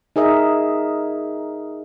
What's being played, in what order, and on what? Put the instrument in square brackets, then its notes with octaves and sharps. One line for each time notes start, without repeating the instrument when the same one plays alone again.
[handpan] D#4 G#4 A#4 D#5 E5